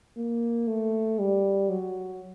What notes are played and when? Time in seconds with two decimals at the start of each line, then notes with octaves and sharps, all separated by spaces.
0.17 A#3
0.67 A3
1.19 G3
1.69 F#3